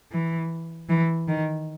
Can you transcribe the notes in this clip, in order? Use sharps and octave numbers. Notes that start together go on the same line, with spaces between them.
E3
E3
D#3